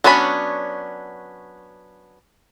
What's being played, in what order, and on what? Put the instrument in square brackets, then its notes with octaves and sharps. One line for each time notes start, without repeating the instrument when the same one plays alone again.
[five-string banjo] F#3 B3 C#4 D4 B5